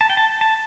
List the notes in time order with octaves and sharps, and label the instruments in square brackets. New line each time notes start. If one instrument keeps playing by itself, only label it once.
[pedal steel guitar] A5
G5
A5
A5